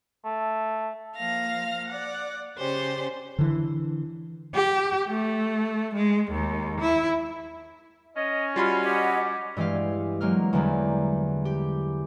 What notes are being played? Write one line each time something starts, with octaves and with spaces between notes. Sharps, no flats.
A3
F3 A#3 F5 F6 A#6
D5 F#5
C#3 C#4 G4 C5 D5 C6
D3 E3
G4
A3
G#3
D#2
E4
C#4 D#5
G3 F4 F#4 B5
G4 D#5 F#5
G2 E3 G#3 G4 F5
F#3 G#3 A#3 F6
E2 D3 E3 G3 A#3
G4